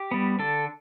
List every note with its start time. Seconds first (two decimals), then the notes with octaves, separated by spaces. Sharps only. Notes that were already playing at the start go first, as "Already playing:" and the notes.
Already playing: G4
0.11 G3 B3
0.39 D3 A4